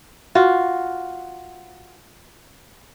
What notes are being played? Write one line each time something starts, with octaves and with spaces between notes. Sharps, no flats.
F4 F#4